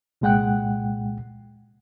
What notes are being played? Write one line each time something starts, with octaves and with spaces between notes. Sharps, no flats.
C2 A#2 G#3 F#5 G5 F#6